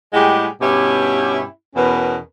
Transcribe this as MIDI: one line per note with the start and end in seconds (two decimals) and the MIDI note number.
0.13 0.47 45
0.13 0.47 55
0.13 0.47 56
0.13 0.47 67
0.13 0.47 68
0.13 0.47 78
0.61 1.44 43
0.61 1.44 47
0.61 1.44 61
0.61 1.44 64
0.61 1.44 67
1.76 2.18 40
1.76 2.18 47
1.76 2.18 61
1.76 2.18 70
1.76 2.18 71